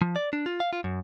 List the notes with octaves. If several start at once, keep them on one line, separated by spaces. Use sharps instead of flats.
F3
D5
D4
F4
F5
F4
F#2